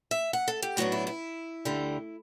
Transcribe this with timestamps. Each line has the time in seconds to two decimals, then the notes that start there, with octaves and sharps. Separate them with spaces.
0.11 E5
0.33 F#5
0.48 A4
0.62 G4
0.77 A2 F#3 B3 D4 F#4
0.92 E4
1.07 E4
1.65 D2 D3 G3